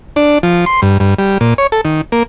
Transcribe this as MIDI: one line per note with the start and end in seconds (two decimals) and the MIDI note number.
0.16 0.38 62
0.43 0.65 53
0.66 0.81 84
0.82 0.98 43
1.00 1.14 43
1.19 1.38 55
1.41 1.54 46
1.58 1.67 73
1.72 1.81 69
1.85 2.01 51
2.12 2.23 58